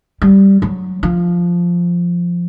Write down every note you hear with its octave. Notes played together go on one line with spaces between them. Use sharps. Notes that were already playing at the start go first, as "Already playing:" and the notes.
G3
F#3
F3